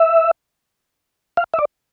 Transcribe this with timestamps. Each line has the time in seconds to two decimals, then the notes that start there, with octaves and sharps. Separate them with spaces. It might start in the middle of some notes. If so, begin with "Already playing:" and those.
Already playing: E5
1.37 F5
1.54 E5
1.59 D5